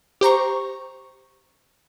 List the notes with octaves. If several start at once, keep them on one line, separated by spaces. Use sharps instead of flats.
G4 C5 A#5 C#6